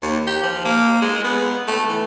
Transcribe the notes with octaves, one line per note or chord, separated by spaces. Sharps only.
D#2
G4
F3
A#3
G#3
B3
A3
E3